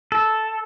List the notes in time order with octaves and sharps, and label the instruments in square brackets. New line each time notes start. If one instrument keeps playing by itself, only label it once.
[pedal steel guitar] A4